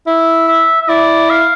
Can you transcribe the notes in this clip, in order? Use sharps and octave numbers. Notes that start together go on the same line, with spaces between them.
E4 E5
E5
E5
E4 D5
F5